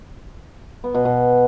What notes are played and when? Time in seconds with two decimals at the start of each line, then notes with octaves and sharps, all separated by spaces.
0.84 B3
0.94 B2
1.05 B2